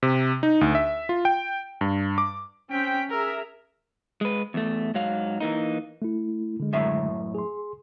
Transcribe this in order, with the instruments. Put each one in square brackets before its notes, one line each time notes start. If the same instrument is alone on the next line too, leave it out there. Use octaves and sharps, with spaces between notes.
[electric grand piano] C3
D#4
D2
E5
F4
G5
G2
D6
[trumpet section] C4 G5 [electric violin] C#4 B6
[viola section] G#4 A#5 [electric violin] A#4 [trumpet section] E5
[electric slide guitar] G#3 B4
E2 A3
G#2 F#3 F5
E3 A#3 D#4
[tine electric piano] A3 E4
D3 G#3
[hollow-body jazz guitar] F#2 A2 E5
[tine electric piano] G#4 C6